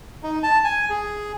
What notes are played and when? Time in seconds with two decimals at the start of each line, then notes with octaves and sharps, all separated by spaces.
0.23 D#4
0.43 A5
0.64 G#5
0.90 G#4